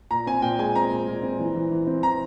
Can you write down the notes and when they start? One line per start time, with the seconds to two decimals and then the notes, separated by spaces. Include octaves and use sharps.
0.11 A#2 A#5
0.27 C4 G#5
0.42 A#2 G5
0.59 G#3 G#5
0.75 C4 A#5
0.91 A#2
1.08 A#2
1.23 C4
1.39 E3
1.55 E3
1.71 E3
1.87 C4
2.03 E3 A#5